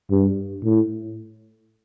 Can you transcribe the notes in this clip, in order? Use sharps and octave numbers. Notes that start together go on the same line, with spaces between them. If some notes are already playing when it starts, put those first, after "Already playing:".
G2
A2